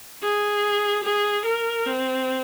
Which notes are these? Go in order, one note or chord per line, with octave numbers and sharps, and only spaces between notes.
G#4
G#4
A#4
C4